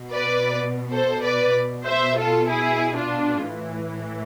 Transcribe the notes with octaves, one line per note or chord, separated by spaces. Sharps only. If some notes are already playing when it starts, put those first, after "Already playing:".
Already playing: B2
B4 D5
A4 C5
B4 D5
B2
C5 E5
F4 A4
E4 G#4
D4 F4
A2 E3